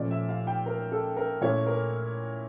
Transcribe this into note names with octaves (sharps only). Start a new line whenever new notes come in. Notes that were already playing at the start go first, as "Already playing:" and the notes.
Already playing: A#2 F3 A3 C#4 D5
E5
F5
G5
A#4
A4
A#4
A#2 A3 C#4 E4 C#5
A#4